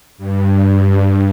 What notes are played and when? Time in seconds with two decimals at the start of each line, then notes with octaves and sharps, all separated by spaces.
0.18 G2